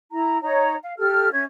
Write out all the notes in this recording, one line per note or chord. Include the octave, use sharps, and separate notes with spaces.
E4 A#5
D#4 C#5 A#5
F5
G4 A4 F6
C#4 E5 G#6